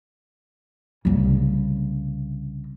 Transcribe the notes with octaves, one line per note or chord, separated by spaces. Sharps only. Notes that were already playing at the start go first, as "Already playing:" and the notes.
C2 C#3